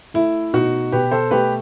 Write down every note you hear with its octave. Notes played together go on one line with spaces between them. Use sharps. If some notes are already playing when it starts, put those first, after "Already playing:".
A3 E4
B2 D#4 F#4
B2 G4 B4
A4 C5
A3 G4 B4